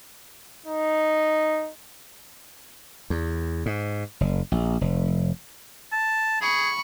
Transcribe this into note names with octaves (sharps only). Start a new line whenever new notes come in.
D#4
E2
G#2
F#1
A#1
F1
A5
G#4 B5 C#6